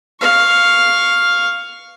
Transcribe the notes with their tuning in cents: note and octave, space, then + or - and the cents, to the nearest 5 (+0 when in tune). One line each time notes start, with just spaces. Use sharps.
F5 +0 C#6 +0